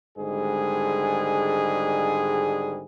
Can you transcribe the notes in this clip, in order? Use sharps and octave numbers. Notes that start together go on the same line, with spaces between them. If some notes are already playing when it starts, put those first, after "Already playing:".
G#1 G#2 D3 G3 G#3 G#4